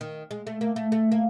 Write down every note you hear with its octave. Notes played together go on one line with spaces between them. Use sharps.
D#3
G#3
A3
A#3
A3
A3
A#3